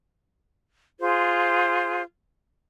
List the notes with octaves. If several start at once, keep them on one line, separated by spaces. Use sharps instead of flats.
F4 G#4 C5